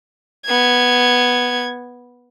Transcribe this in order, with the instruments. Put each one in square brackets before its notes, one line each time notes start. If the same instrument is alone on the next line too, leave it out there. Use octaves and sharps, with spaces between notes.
[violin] B3 G#6